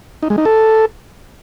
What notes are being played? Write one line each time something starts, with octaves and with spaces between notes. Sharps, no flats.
D#4
G#3
D#4
A4